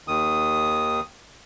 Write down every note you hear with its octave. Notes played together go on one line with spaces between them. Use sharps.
D#2 D#3 D#6